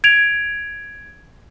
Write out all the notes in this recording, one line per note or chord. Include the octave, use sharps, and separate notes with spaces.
G#6 D7 F7